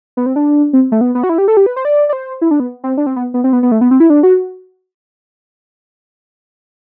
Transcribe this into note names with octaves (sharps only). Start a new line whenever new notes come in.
B3
C4
D4
C4
A3
B3
B3
F#4
E4
G4
A4
G4
B4
C5
D5
D5
C5
E4
D4
B3
C4
D4
C4
B3
B3
C4
B3
B3
A3
B3
C4
E4
D4
F#4